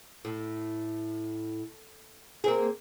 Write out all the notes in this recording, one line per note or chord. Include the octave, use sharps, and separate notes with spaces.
A2
A#3 C4 G#4